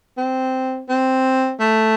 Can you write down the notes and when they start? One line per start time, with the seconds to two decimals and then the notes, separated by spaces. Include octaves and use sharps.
0.18 C4
0.89 C4
1.60 A3